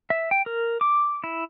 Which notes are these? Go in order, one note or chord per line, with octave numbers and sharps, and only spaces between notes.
E5
G5
A#4
D6
E4